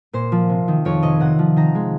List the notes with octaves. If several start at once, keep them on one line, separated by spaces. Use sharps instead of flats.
A#2 C5
F3
C3
D#3
F2 C#5
C3 D#5
C3 F#5
F3
D#3 A#5
G#3